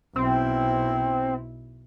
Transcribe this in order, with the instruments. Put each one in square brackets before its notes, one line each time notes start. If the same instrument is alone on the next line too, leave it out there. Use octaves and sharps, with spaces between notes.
[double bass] B1 E4 [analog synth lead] C4